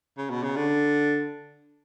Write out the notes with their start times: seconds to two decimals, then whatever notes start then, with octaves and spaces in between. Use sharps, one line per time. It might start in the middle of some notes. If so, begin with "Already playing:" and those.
0.18 C#3
0.30 B2
0.43 C#3
0.56 D3